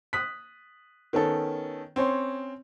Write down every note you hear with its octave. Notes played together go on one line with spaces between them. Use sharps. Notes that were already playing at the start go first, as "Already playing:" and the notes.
D#6 F#6 B6
D#3 B3 C#4 A4
C4 C#4 C#5 C6